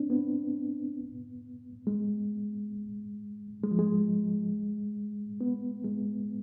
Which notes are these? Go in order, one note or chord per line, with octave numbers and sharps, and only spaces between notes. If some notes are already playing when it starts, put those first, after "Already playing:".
Already playing: C4 D4
B3
G#3
G#3
F3
G#3
B3
G#3